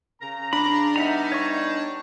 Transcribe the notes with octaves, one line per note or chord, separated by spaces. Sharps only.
C#3 A#5
D4 B5
G3 B3 D#4 E5 F#5 A#5
C#5 C#6